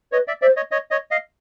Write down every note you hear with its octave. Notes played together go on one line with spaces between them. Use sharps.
B4 C#5 D#5
D5 E5
C5 D5 E5
C#5 D#5
C#5 D#5
C#5 D#5
D#5 F5